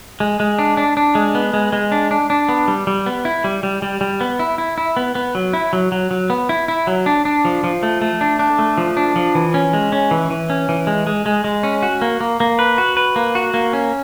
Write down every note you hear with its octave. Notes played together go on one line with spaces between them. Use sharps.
G#3
G#3
D4
D4
D4
G#3
B3
G#3
G#3
D4
D4
D4
B3
G3
G3
B3
E4
G3
G3
G3
G3
B3
E4
E4
E4
B3
B3
F#3
E4
F#3
F#3
F#3
B3
E4
E4
F#3
D4
D4
F3
F3
A3
A3
D4
D4
A3
F3
D4
F3
E3
C#4
G#3
C#4
E3
E3
C#4
E3
G#3
G#3
G#3
G#3
C#4
F#4
A#3
A#3
A#3
B4
F#4
B4
A#3
F#4
A#3
C#4